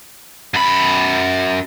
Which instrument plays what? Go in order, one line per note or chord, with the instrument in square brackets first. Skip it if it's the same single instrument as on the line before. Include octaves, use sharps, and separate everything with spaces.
[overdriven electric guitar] F#2 B5